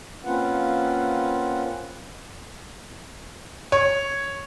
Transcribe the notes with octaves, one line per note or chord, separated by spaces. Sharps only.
A#3 C4 C#4 F4 B4 F#5
C#5